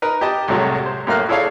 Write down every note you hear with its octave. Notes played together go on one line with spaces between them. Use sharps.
D#4 A#4 B4
G4 D#5 A5
C2 A2 C3 F#3 G#3
C5
F#2 A2 A#3 F5 F6 F#6
E4 G#4 A4 C#5 D5 F5